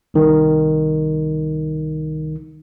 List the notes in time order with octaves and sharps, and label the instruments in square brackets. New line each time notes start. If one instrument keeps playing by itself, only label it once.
[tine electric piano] C2 D#3